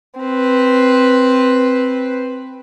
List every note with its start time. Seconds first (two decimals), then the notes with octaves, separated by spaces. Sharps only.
0.20 C4 B4